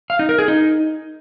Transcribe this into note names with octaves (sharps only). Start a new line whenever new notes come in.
F5
D#4
A#4
G#4
D#4